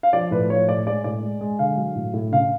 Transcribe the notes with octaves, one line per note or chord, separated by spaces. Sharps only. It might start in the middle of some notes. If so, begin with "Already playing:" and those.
F5
F3 D5
A2 B4
F3 C#5
A2 D5
G#3 D5
A2 D5
G#3
G#3
D3 F5
F#3
A2
A2
C#3 F5